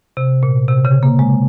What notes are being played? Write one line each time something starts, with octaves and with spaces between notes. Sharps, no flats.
C3
A#2
C3
C#3
A#3
G#3